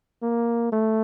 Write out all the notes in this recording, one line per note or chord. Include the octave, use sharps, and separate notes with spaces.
A#3
A3